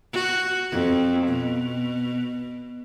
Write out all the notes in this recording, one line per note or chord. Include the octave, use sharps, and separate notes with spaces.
F#4
F2
B2